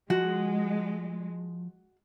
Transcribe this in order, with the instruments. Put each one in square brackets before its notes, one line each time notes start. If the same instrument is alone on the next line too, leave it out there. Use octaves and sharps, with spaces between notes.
[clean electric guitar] F3 [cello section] G#3 [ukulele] F#4